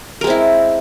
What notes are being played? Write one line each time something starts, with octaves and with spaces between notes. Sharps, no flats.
G#3 C4 E4 A#4